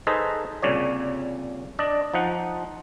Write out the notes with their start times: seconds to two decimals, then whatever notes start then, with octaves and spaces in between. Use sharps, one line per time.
0.07 D#4 G#4 A4 B4 C5 D#5
0.62 C2 A#2 C#3 C#5 D5
1.79 D4 D5 D#5
2.14 F3 D#4 F#5